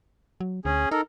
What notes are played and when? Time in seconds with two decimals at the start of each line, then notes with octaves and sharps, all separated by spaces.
0.40 F#3
0.65 D2 C#4 G#4
0.91 D#4 A4 A#4